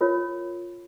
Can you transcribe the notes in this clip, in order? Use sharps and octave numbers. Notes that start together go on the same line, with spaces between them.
F4 A#4 C#5